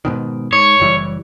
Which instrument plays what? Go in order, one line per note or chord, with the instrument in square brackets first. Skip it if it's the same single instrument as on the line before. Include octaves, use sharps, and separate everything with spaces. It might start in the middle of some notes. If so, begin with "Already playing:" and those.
[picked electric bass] G#2 B2 D#3
[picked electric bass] G#2 [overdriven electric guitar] C#5
[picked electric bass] F#1 E3 G3